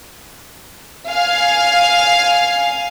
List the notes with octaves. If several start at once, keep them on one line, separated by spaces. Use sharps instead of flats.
F5 G#5